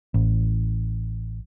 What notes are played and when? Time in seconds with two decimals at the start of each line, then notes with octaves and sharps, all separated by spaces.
0.14 A1